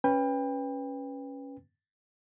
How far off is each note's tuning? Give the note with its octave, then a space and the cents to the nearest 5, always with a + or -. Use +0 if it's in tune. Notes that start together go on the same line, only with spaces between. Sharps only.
C#4 +0 B4 +0 G5 +30